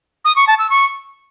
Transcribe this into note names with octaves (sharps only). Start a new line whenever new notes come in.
D#6
C#6
A5
E6
C#6